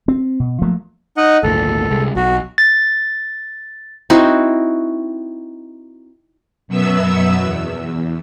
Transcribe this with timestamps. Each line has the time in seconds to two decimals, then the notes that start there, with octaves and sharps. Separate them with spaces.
0.08 C4
0.40 B2
0.62 F3 F#3 A3 A#3
1.17 D#4 D#5 F#5
1.43 G#1 D2 A#2 A4
1.91 C2 G#3
2.16 B1 F#4
2.58 A6
4.10 C4 D#4 E4 F#4
6.68 F#2 B2 F#3 B3 E5 E6
7.42 E2